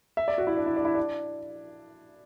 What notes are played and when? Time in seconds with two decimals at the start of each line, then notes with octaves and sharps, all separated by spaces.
0.17 E5
0.28 D5
0.38 F#4
0.47 E4
0.57 D4
0.66 E4
0.76 D4
0.85 E4
0.95 D4